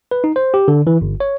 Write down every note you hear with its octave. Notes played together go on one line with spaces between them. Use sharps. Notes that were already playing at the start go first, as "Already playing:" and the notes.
B4
D#4
C5
G4
D3
E3
G1
C#5